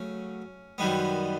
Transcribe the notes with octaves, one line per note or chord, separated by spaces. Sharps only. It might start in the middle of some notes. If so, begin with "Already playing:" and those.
Already playing: C#3 F#3 A3 C#4
F#2 D#3 G3 B3